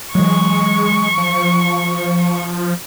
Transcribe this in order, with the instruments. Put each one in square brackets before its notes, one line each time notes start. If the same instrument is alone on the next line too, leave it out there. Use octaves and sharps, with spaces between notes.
[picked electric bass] E3 F#3 [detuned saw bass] G#3 [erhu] C#6
[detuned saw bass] F3